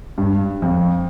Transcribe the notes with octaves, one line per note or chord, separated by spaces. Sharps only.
G2
F2